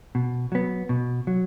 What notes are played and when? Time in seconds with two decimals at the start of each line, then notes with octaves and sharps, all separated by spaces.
0.15 B2
0.52 F#3 B3
0.89 B2
1.27 F#3